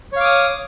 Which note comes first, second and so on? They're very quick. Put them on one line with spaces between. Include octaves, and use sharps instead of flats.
C#5 F5 D6 D#6